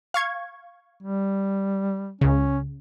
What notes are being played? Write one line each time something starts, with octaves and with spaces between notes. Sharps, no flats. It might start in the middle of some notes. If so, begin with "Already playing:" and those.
F5 C#6 G#6
G3
C#2 C#3 C#4